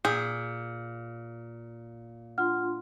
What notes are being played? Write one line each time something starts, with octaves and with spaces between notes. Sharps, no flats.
A#2 G#4 G6
D4 F4 F#5 C6 F6